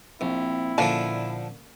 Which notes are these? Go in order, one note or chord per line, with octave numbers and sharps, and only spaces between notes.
A#1 C4 E4
A#2 D3 F3 A#3 C#4 D4 A5